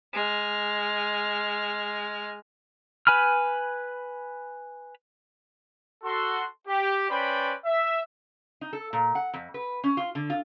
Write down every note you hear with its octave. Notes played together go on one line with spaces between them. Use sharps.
G#3 F6
B4 G#5 B5 F6
F#4 A4 C6
G4
C#4 B4 C5 D5 G5 B5
E5
D#4
A4
A#2
F#5
F2
B4
C#4
F4
D3
F4